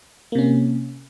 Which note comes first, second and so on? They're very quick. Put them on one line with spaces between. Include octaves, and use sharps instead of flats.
A#3 C3 C#4